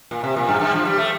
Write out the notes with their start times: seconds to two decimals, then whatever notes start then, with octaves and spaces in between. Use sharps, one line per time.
0.11 A#2
0.24 C3
0.36 A#2
0.49 G2
0.61 G2
0.73 F3
0.85 G3
0.98 A3